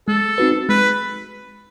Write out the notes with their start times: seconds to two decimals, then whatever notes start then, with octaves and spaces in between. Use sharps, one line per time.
0.08 G#3 A4
0.38 C4 D#4 F#4 B4
0.69 G#3 B4